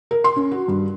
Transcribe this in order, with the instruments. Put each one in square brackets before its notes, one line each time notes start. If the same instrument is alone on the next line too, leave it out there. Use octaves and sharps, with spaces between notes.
[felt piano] A#4
C6
C#4
F#4
G2